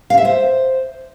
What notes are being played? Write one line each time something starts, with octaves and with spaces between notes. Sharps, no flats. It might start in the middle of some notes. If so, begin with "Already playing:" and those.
F5
E5
C5